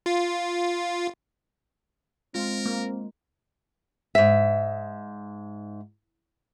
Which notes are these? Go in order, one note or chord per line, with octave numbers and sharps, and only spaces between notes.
F4
G#3 C4 F4 A#4
A#3
G#2 E5